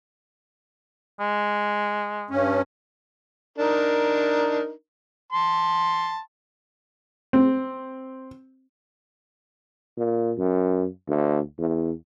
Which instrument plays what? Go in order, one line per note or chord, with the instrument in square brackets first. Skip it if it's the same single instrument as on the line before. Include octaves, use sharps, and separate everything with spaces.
[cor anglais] G#3
[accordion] G2 C#4
[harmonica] D4 D#4 A#4
A5 C6
[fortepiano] C4
[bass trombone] A#2
F#2
D2
E2